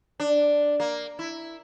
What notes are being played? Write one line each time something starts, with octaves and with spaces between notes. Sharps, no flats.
D4
A#3
E4